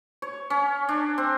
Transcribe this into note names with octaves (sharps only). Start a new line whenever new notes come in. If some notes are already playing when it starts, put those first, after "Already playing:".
C#5
C#4
D4
C4